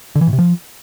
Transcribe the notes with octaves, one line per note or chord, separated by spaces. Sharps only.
D3
E3
A2
C3
F3